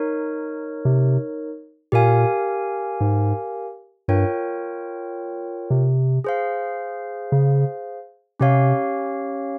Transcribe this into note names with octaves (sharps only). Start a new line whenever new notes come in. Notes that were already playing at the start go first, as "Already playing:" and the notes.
Already playing: D#4 A#4 C#5
C3
A#2 G4 A#4 F5 G#5
G#2
G2 F4 A#4 C#5 G5
C3
G#4 C5 F5
C#3
C3 C#4 G4 C#5 F5